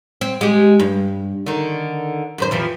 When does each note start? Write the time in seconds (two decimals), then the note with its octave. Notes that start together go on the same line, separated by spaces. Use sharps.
0.21 C4
0.41 G#3 G4
0.80 G2
1.46 D3 D#3
2.38 F#2 D#3 C5
2.51 F2 E3 F3